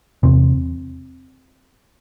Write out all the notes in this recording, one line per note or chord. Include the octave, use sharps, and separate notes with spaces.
E2 C3 C4